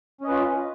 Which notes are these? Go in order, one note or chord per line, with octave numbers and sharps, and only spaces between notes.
C#4 F4 B4 D#5